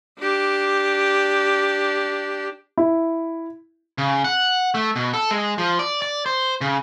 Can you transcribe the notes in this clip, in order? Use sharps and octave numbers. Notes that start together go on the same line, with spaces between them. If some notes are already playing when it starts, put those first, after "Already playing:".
D4 G4
E4
C#3
F#5
A3
B2
A4
G#3
F3
D5
D5
C5
C#3